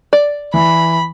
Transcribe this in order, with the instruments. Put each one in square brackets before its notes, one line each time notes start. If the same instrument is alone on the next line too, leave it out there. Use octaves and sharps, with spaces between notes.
[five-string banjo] D5
[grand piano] E3 [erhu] B5